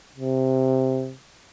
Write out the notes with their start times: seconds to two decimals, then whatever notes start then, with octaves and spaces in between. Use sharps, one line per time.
0.16 C3